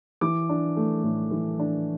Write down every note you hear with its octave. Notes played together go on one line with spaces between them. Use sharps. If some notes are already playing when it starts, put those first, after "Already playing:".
E3 D6
D4
A3
A2
E3
D4